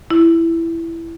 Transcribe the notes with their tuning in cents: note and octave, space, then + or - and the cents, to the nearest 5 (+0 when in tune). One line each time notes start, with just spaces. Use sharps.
E4 +10